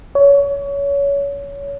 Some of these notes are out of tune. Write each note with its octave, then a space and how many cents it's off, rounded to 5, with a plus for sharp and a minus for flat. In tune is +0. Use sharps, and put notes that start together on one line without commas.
C#5 +25